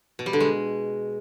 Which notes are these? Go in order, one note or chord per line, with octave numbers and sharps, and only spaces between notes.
B2
G3
D3
G#3